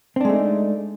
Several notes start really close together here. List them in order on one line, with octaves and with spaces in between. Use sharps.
C4 D4 G#3 A3 D#4